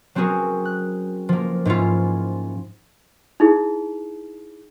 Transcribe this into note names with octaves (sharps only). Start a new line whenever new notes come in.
F#3 C4 C#4 F#4 G#4 A#4
F#6
F3 A#3
G#2 C#4 E4 F4
D#4 E4 G#4